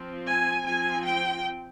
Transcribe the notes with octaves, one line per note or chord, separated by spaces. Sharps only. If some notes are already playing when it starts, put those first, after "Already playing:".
Already playing: F3 C4
G#5
F3 C4 G#5
G5